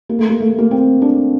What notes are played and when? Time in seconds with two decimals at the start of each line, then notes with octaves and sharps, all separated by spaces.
0.09 A#3
0.19 A3
0.29 A#3
0.40 A3
0.58 A#3
0.71 C4
1.02 D4